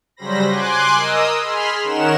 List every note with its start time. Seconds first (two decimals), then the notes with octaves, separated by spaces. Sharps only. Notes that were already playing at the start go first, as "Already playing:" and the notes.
0.16 C#3 F#3 G3 C5 B5 A#6
0.49 G#5 C6 D6 F#6
0.95 A#4 D#5 D#6 E6
1.41 G#4 B5 C6 F6
1.83 D#3 C#4 D#4 A#4 F#5 E7